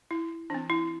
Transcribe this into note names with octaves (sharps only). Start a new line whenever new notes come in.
E4
E3 C4 D4
E4